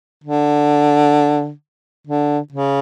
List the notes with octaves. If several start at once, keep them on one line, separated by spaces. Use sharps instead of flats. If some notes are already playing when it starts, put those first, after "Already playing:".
D3
D3
C#3